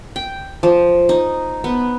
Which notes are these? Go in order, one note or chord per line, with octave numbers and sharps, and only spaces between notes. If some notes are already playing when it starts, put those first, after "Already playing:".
G5
F3
D#4
B3